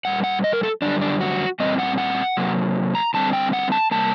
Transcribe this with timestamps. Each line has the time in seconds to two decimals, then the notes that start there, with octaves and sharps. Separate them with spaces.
0.05 A#2 G3 A#3 F#5
0.24 F#5
0.44 D#5
0.53 A#4
0.63 A4
0.82 F#2 D3 G3 D4
1.01 D4
1.21 F#4
1.60 A#2 G3 C4 D#5
1.79 F#5
1.98 F#5
2.37 C3 F#3 A#3
2.95 A#5
3.14 D3 G3 C4 A5
3.33 G5
3.53 F#5
3.72 A5
3.91 C3 G3 A#3 A5